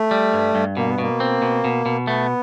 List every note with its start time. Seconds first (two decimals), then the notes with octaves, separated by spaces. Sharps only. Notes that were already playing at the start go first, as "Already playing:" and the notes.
Already playing: A3
0.11 G3
0.33 G2
0.55 G2
0.77 B2 A#3
0.89 B3
0.99 B2 A#3
1.20 C4
1.42 B2
1.65 B2
1.86 B2
2.07 A3 B3